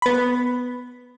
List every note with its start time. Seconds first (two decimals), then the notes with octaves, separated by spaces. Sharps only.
0.02 B3 B5